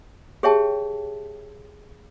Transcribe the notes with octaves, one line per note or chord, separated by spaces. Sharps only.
G4 G#4 C#5 E5 G5 A5